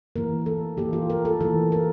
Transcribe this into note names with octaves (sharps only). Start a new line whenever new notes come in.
E3 A#3 A#4
A4
E3 A#3 G4
F4
A#4
A4
E3 A#3 A4
A#4